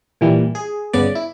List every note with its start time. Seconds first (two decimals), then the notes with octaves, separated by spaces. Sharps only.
0.21 A#2 E3 G3
0.55 G#4
0.93 G1 C#3 B3 D5
1.15 E4